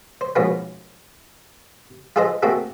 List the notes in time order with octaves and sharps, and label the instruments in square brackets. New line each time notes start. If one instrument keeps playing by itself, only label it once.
[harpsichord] C5
G#2 B2 F3 A#3 B3 C#4
F4 G#4 A4 B4 C5 D#5
A3 A#3 C4 F#4 G#4 A4